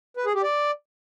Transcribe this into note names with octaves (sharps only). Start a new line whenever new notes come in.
B4
G#4
G4
D5